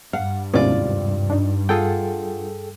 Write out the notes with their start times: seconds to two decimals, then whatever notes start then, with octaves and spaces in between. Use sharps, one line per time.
0.13 G2 F5 F#5
0.53 D#2 G#2 C3 B3 C#4 E4 F4 D5
1.30 D4 D#4
1.69 F4 G#4 A4 F#5 G5